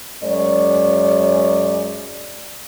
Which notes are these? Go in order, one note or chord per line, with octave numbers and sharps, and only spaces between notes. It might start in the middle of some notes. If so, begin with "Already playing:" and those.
F#2 G#3 C#5 D5